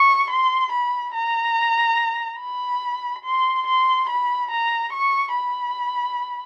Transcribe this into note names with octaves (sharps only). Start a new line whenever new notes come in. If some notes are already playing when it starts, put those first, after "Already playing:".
Already playing: C#6
C6
B5
A#5
B5
C6
C6
B5
A#5
C#6
B5